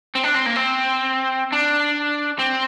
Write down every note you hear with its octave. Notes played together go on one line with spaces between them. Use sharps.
C4
D4
C4
A#3
C4
D4
C4